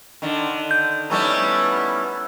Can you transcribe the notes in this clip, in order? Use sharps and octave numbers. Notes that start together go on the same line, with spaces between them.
D3 D#3
G6
G3 A3 B3 C#4 D#4 E4